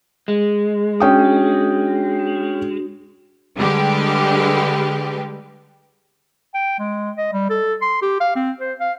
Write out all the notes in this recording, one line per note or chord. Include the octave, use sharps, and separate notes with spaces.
G#3
C#4 D4 F#4 G5 D#6
D3 G3 G#3 G4 B4
G5
G#3
D#5
G3
A4
C6
G4
F5
C4
C5
F5